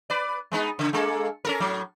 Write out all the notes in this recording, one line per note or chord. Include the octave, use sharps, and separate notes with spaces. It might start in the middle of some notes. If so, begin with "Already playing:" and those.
B4 D5
G#3 B3 D#4
C#3
G#3 A#3 A4
C#4 A4 A#4
A2 F#3